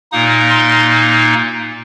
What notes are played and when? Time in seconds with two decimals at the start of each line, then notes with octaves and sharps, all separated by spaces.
0.12 A#2 A#3 D#4 D#6
0.50 C6